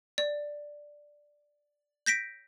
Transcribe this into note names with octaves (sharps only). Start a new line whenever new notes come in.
D5
G6 A#6 B6 D7